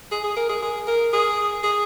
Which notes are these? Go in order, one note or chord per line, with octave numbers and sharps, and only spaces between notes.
G#4
G#4
A#4
G#4
G#4
A#4
G#4
G#4